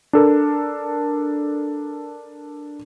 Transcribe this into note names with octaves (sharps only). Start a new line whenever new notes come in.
D4 A4 A#4